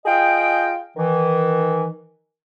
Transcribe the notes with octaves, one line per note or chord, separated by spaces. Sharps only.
F4 G#4 D#5 G5
D#3 E3